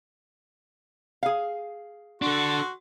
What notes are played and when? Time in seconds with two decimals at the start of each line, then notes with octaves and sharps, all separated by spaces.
1.23 G#4 F5
2.22 D4 F#4 A4 C6